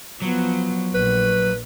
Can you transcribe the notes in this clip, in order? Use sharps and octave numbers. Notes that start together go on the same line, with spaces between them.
F3 F#3 B3
A#1 B4